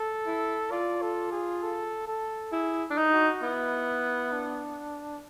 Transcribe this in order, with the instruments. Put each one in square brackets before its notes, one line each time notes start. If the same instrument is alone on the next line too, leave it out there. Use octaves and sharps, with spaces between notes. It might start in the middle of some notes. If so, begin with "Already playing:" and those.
Already playing: [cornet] A4
[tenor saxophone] E4
[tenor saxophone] F4 [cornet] D5
[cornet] A4
G#4
A4
A4
[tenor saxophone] E4 [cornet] G#4
[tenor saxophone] D4
D#4
[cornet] F#4
[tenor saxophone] B3 [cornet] E4
[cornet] D4